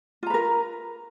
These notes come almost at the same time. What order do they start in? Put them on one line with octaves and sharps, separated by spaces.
F4 A#5 B4 A#4